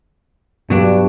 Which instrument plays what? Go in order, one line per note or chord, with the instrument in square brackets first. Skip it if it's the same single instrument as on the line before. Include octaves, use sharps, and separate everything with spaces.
[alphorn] G2 [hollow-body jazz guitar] B2 F#3 D4